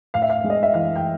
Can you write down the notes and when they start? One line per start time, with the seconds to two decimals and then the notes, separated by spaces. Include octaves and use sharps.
0.14 A2 F5
0.22 E5
0.30 F5
0.44 G#3
0.50 D#5
0.63 E5
0.74 E3 F5
0.96 G5